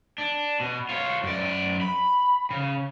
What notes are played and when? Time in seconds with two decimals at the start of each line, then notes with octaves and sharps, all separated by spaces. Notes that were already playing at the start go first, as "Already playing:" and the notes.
0.18 D4
0.60 B2
0.89 F4 C#5
1.23 F#2 D5
1.81 B5
2.50 C#3